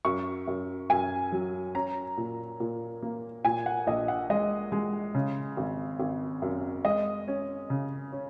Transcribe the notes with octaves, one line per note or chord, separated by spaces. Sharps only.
F#2 C#6
F#2
F#2 G#5
F#3
C#4 A#5
A#2
A#2
A#3
A#2 G#5
F#5
A#1 D#5
F#5
G#3 D#5
G#3
C#3
G#1
G#1
F#2
G#3 D#5
C#4
C#3
C#4